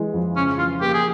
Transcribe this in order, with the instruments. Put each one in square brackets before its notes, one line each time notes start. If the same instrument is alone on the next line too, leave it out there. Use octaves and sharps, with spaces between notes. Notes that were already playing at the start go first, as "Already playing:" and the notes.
Already playing: [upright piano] E3 G#3
F2
[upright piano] C#3 [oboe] C#4
[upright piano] E3 [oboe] F4
[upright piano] A#3 [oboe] G4
[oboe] G#4